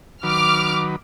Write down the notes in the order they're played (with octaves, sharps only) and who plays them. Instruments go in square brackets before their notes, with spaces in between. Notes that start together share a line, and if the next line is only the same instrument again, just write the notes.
[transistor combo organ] D#3 F#3 B4 [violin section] D6 F6